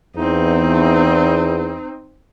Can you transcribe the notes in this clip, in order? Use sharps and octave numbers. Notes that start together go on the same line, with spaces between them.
E2 C4 D#4